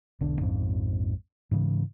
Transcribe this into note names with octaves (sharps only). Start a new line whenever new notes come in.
E1 B1 D3 D4
A#1 F2 G#2
G#2 C#3 E3